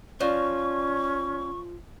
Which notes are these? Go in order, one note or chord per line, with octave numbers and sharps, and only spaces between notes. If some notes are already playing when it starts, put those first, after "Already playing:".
F3 C#4 C#5 D5 F5 C#6